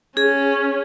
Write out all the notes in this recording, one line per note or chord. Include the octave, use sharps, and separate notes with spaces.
C#4 G#4